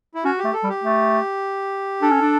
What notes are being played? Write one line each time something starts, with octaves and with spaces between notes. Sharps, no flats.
E4
C#4 F#4
G4
A3
A4
G3
G4
A3
D4 A4
C#4
D4